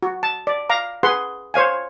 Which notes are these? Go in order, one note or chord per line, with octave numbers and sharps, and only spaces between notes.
F#4
A5
D5
F5 A#5 D6
G#4 B4 F#5 C6
C5 C#5 F5 G#5